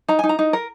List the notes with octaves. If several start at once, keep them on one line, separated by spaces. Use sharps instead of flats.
D#4 A#5
D#4 G#5
A#5
D#4
A#4